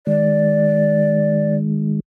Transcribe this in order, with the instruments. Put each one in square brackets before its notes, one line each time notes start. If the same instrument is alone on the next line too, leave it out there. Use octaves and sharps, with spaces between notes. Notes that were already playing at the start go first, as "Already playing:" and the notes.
[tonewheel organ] D#3 G#3 [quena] D5